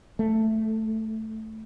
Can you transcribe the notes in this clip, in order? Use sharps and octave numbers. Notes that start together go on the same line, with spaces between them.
A3